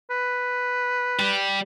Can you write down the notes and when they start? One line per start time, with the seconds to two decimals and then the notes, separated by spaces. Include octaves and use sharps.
0.10 B4
1.19 G3